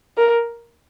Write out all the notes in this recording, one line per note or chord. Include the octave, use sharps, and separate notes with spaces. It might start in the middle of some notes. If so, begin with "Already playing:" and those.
A#4